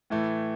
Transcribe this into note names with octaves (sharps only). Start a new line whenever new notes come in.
A2 E3 A3